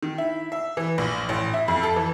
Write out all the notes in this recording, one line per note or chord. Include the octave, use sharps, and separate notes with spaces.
D#3
E4
E5
E3
A#1
A1
E4
F2
A4
E3